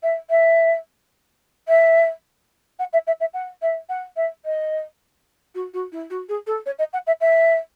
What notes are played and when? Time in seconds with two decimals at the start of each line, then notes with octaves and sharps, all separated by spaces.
0.03 E5
0.30 E5
1.68 E5
2.79 F#5
2.93 E5
3.07 E5
3.20 E5
3.33 F#5
3.62 E5
3.89 F#5
4.16 E5
4.45 D#5
5.55 F#4
5.73 F#4
5.92 E4
6.10 F#4
6.28 G#4
6.47 A4
6.66 C#5
6.78 D#5
6.93 F#5
7.07 E5
7.20 E5